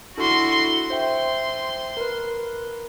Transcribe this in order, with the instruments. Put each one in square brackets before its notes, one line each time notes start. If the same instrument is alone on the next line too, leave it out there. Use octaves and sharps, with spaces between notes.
[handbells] D4 E4 A4 [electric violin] F#4 C6
[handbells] C5 E5 G5 [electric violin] C6
[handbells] A#4 B4